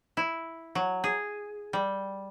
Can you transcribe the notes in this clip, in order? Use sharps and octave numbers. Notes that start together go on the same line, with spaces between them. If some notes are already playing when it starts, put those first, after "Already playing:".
E4
F#3
G#4
G3